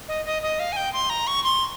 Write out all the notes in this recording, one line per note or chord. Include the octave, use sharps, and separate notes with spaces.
D#5
D#5
D#5
F5
G#5
G5
C6
A#5
C#6
C6